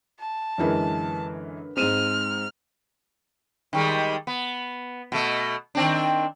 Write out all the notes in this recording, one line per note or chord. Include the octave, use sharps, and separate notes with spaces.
A5
F#2 D3 E3 G#3 A#4 B4
G#2 G#3 C4 F6 D#7 E7
D#3 G3 G#3
B3
B2 A3
D#3 C4 D4